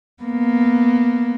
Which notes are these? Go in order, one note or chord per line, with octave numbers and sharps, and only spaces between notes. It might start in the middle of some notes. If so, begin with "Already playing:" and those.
A#3 B3